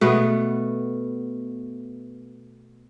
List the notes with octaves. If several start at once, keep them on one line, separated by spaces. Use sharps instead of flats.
B2 A3 B3